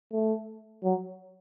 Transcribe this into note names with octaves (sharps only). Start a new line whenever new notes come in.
A3
F#3